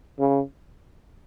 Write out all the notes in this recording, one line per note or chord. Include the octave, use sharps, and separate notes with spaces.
C#3